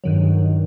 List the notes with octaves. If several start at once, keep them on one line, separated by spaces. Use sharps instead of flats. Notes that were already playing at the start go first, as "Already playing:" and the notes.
G2 D#3 F#3